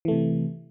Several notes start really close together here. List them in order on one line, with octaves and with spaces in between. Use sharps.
E3 A3 C3